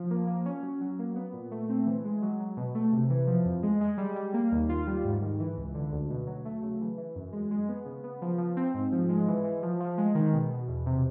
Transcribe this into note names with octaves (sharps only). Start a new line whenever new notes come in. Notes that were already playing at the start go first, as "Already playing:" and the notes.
Already playing: F3
A#3
A#3
C#4
F#3
F#3
A#3
B3
A#2
A3
C4
E3
G#3
F#3
F#3
B2
A3
C3
E3
F3
F2
G#3
G#3
G3
G3
A#3
D#2
F4
G3
G#2
D#3
E3
C#2
D3
D2
B2
F#3
A3
C#3
E3
E3
F#2
G#3
G#3
B3
C#3
B3
F3
F3
C4
G#2
F3
G#3
E3
E3
F3
F3
G#3
D#3
B2
B2
E2
C3